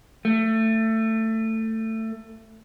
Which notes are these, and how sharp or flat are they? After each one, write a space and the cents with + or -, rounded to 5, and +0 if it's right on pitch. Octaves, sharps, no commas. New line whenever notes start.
A3 +20